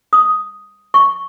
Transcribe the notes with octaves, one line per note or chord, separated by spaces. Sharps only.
D#6
C#6